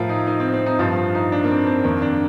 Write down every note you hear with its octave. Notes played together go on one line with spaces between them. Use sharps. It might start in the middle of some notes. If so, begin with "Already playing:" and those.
Already playing: A2 F3 F4 A#4
D#4
D#4
C4
C4
D#4
G2 F3 F4
F4
D#4
D4
A#3
C4
C4
F2 D#3 A#3
D4